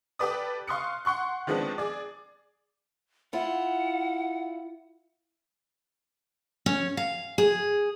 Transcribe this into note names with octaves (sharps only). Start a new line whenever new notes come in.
G4 A4 B4 D5 D#6
F5 C6 C#6 D#6 F#6 C#7
F#5 C6 C#6 F#6
D#3 F3 G#3 B3 C4 D4
G#4 D5
E4 F4 F#5
C#4
F5
G#4